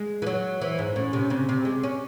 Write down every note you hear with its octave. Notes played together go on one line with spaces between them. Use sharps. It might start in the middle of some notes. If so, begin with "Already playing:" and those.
Already playing: G#3
E3
F#3 C#5
E3 C5
G#2
A2 C#4
C3
C#3 C4
C3
G#3
C#4